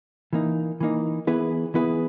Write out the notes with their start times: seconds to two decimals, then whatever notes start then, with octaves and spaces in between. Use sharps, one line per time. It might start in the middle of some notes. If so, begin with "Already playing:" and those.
0.33 E3 A#3 D#4
0.80 E3 A#3 D#4
1.27 E3 B3 E4 G#4 B4
1.74 E3 B3 E4 G#4 B4